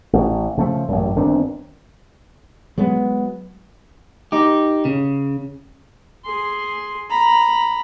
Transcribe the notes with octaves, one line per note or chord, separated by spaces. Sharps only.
A1
C#3 F3 A3
A1 F#2
G1 D#3 C4 D4
F#3 G#3 B3
D#4 G4
C#3
G#4 C6
A#5 B5